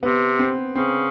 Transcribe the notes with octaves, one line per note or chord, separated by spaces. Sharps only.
C3 B3
C4
C#3 C4